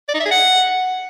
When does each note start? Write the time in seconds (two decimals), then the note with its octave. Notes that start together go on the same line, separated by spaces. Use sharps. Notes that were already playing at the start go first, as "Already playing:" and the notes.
0.09 D5
0.14 D#4
0.20 E5
0.25 G#4
0.31 F#5